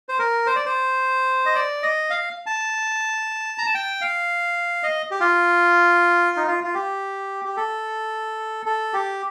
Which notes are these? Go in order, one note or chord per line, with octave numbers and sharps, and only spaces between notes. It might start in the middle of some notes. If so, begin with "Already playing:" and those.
C5
A#4
C5
D5
C5
D#5
D5
D#5
F5
A5
A#5
A5
G5
F5
D#5
G4
F4
D#4
F4
F4
G4
G4
A4
A4
G4